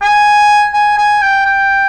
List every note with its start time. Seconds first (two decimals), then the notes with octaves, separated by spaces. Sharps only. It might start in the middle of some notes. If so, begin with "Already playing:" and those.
0.02 G#5
0.74 G#5
0.98 G#5
1.22 G5
1.45 G5